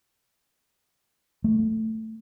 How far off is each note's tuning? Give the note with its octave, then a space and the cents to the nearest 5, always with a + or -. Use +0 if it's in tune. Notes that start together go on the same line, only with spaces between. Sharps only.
A3 +5